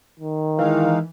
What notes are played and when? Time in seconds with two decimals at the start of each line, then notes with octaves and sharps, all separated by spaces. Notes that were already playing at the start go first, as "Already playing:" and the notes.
0.19 D#3
0.59 E3 G#3 D#4 F5